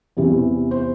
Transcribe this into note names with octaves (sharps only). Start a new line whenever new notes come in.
E2 C3 E3
C5